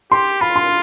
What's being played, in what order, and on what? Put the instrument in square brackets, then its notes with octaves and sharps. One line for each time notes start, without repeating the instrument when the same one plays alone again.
[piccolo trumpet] G4 [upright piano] C6
[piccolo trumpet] F4 [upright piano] B5
[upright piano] C6